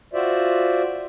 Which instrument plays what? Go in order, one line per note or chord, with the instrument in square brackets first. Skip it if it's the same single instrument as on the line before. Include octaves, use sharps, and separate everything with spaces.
[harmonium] F4 F#4 C5 D5 E5